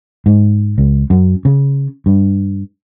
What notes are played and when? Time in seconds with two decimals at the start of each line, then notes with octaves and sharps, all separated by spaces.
0.26 G#2
0.78 C#2
1.10 F#2
1.45 C#3
2.06 G2